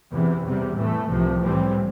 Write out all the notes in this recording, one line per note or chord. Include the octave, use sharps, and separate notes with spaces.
E2 C3 E3
E2 C3 G3
A2 E3 A3
C2 C3 F3
A2 E3 G3 C4